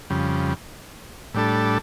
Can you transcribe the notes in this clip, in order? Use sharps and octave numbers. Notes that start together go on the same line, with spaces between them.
F2 C#3 G3
A2 G3 D4 A4